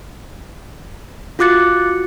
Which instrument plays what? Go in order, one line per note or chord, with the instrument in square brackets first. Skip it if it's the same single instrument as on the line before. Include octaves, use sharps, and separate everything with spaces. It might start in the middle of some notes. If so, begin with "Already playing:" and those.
[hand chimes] F4 F#4 D6 F#6 A6 C#7